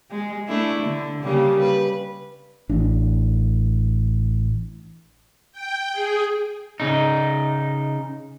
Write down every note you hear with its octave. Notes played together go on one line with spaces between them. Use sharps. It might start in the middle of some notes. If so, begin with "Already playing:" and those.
G#3
A3 D4 E4
D3
C#3 G3 A#3
B4
A1 D4
G5
G#4
C#3 D#4